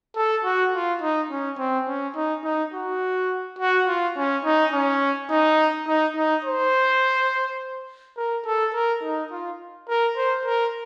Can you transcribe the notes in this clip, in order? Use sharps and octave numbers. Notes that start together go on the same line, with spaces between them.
A4
F#4
F4
D#4
C#4
C4
C#4
D#4
D#4
F#4
F#4
F4
C#4
D#4
C#4
D#4
D#4
D#4
C5
A#4
A4
A#4
D#4
F4
A#4
C5
A#4